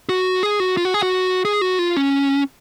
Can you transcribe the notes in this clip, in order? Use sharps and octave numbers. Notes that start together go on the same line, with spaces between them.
F#4
G#4
F#4
F4
F#4
G#4
F#4
G#4
F#4
F4
C#4